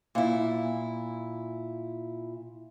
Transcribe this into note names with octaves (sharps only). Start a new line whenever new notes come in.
A#2 E4